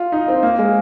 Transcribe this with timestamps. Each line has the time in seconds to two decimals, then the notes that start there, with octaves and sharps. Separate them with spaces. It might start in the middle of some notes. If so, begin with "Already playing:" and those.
Already playing: F4
0.12 D#4
0.28 C4
0.43 A#3
0.59 G#3